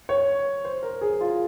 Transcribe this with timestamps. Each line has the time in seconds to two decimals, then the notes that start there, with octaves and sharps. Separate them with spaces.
0.09 C#5
0.65 C5
0.83 A#4
1.01 G#4
1.21 F4